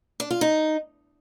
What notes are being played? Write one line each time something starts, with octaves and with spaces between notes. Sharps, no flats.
D4
F4
D#4